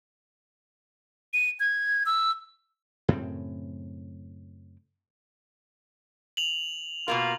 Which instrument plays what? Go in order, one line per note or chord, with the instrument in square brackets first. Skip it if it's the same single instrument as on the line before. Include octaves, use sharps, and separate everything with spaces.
[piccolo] D#7
G#6
E6
[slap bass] F#2 A2 C#3 C4
[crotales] F7 F#7
[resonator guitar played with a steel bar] B2 A#3 A#4 [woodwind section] F4